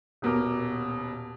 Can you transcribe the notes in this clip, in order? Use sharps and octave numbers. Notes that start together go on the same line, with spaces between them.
D#1 B2 A#4 D6